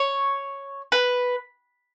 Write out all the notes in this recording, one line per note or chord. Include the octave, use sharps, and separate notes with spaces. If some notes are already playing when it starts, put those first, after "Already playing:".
Already playing: C#5
B4